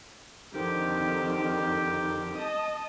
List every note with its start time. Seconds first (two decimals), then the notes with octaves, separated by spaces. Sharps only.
0.54 F2 D3 D#3 C4 D#4 G4
2.37 D#5 A5 D#6